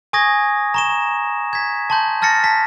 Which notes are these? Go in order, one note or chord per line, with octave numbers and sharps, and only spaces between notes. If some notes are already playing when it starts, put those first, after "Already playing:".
G#5 C#6 D#6 G#6 A#6
A#5 C#6 E7
G#6 B6
A5 C6 G6
A5 F6 A6 A#6 C#7
A5 B6